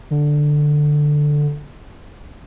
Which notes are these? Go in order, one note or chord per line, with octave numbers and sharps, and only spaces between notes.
D3